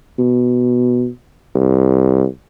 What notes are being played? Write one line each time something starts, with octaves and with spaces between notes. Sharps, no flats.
B2
C2